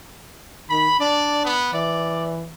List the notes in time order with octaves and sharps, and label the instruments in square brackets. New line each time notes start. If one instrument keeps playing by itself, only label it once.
[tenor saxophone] D#3 [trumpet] B5
[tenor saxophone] D4 [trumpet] D5
[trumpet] B3
[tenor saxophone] E3 [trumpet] D5